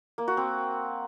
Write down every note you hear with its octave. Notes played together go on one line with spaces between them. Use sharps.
A#3
F#4
C4